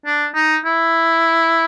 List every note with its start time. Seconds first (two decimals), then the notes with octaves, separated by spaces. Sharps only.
0.06 D4
0.35 D#4
0.65 E4